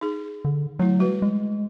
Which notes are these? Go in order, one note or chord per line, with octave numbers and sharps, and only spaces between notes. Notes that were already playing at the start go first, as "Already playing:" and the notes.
D#4 G#4
D3
F#3 A3 E4
G3 F#4 B4
G#3